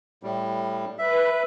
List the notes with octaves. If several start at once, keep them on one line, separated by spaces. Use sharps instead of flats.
A2 G3
B4 E5